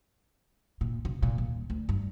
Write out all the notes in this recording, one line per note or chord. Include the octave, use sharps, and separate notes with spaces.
A#2
C#3
A#2
D#1
D2
G2